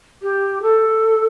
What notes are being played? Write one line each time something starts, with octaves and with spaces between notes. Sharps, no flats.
G4
A4